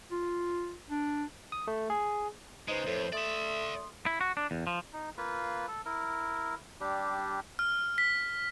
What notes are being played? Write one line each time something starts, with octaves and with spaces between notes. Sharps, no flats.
F4
D4
D#6
A3
G#4
C#3 G#3 D#4 B4 C5
F2 A2
A3 D5 E5 C6 D#6
E4
F#4
D4
E2
F3
D#4
A#3 F4 B4
A4
E4 A#4
G3 D4 G4
F6
B6